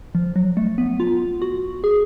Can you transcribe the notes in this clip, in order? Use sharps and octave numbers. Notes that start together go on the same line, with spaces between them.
F3
F#3
A3
B3
F4
F#4
G#4